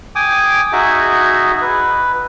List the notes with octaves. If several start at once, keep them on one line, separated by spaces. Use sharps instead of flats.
G5 G#5 D6 D#6
D#4 F#4 G#4 E5
B4